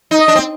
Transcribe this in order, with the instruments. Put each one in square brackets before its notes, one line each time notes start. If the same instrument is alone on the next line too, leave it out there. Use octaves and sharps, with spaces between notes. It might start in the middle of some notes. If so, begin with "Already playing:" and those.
[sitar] D#4
[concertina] D#5
[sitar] D4
C4